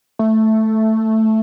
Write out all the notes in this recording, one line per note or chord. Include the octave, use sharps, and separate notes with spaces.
A3